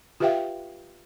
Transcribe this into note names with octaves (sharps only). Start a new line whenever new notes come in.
F4 G4 B4 E5 F5 G5